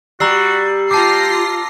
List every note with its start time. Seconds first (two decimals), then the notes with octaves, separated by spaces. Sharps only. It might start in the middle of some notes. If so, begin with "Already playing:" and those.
0.20 G3 F#4 A#5 E6 C7
0.91 F4 G4 A5 D6 A#6 C7